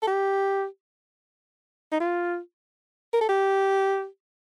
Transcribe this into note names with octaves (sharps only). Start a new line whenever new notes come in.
A4
G4
D#4
F4
A#4
A4
G4